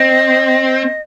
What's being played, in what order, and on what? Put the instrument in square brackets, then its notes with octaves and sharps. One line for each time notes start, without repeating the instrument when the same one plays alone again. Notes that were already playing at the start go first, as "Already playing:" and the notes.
Already playing: [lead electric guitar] C4 [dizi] D#5